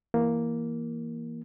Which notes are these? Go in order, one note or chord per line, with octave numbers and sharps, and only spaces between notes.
E3 A#3